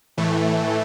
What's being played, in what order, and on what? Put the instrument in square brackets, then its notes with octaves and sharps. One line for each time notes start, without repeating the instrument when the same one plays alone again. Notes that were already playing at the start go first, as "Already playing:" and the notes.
[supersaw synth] A2 E3 A3